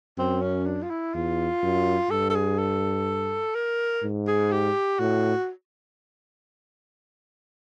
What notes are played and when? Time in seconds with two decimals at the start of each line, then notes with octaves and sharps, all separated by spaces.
0.18 F#2 C4
0.42 C#4
0.66 D4
0.83 F4
0.91 E4
1.14 E2 F4
1.63 F#2
2.10 G2 A4
2.30 A4
2.35 G#4
2.59 A4
3.55 A#4
4.03 G#2
4.27 G#4
4.51 G4
4.99 A2 F#4